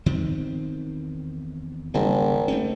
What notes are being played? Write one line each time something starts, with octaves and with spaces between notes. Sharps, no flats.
E2 D#3 C4
G#1 C#3 G3 A#3
A3 C4 C#4